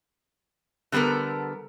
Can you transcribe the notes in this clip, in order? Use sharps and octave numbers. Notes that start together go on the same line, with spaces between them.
D3 G3 B3 A4 A#4